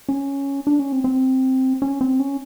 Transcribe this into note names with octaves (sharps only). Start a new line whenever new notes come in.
C#4
D4
C#4
C4
C4
C#4
C4
C#4